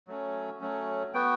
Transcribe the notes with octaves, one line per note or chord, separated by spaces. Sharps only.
F#3 A3 C#4
F#3 A3 C#4
B3 F#4 G5